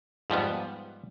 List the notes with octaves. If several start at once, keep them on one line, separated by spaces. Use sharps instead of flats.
G#2 F3 G3 B3